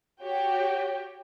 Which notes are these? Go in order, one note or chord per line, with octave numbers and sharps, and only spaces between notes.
F#4 G4 C#5 G5